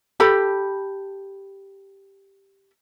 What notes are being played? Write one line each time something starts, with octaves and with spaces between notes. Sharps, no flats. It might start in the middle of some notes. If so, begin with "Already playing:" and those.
G4 A4 B5